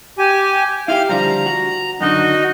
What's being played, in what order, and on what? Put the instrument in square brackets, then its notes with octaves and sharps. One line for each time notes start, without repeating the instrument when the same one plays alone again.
[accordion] G4 G#5
[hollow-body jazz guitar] E4 F4 G4 [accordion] F5 F6
[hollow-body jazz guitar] D3 F3 G3 [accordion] A#5
[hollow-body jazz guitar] F#4
[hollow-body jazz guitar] F#2 D3 [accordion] D#4 F#4 D#5